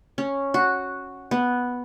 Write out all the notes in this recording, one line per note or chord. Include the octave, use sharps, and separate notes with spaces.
C#4
F#4
B3